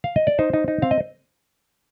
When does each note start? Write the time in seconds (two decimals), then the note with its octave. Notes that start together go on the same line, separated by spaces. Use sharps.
0.04 F5
0.16 D#5
0.27 D5
0.39 D#4 C5
0.54 D#4
0.68 D#4
0.82 C4 F5
0.91 D#5